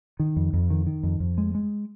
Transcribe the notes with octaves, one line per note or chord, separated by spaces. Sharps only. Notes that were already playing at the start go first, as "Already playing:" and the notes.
D#3
F2
F2
D#3
D#3
F2
F2
G#3
G#3